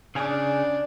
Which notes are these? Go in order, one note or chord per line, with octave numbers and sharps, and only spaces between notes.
C#3 D4 G#4